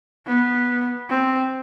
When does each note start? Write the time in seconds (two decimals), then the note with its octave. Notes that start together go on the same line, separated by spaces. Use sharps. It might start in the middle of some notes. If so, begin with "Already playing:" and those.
0.27 B3
1.10 C4